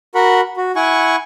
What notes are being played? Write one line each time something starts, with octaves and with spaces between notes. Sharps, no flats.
F#4 A#4 F#5 B5
F#4
E4 F#5 G#5 C#6